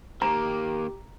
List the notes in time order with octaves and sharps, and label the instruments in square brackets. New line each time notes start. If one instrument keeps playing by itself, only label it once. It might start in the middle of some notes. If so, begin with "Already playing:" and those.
[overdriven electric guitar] D#3 A#3 [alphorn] G4 [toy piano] A#5